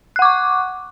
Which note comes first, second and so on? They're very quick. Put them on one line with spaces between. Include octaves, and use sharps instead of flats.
F#6 F#5 D6 C#6